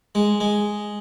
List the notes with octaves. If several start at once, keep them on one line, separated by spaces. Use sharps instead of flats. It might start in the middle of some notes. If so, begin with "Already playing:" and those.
G#3
G#3